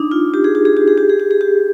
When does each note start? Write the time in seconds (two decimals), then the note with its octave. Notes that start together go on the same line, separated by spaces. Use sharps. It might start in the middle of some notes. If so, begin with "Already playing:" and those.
Already playing: D4 D#4
0.11 F4
0.34 G4
0.44 G#4
0.55 G4
0.65 G#4
0.77 G4
0.88 G#4
0.98 G4
1.09 G#4
1.20 G4
1.31 G#4
1.41 G4